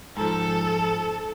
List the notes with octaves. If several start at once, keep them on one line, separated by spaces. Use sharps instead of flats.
G#2 F3 A4